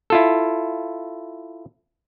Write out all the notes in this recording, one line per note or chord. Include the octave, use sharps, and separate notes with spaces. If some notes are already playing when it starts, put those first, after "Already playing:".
E4 F4 A4